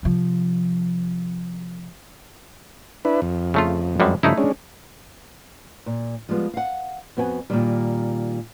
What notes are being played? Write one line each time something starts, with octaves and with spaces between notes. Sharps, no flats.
C3 F3
D4 E4 B4
F2
C#3 A3 F4
F#2 G3 G#3
G2 C#3 F3 A3 D#4 E4
G#3 C#4 D4
A#2
F3 G3 G#3 B3
F5 F#5
F2 B3 F#4 G5 G#5
A#2 D#3 G3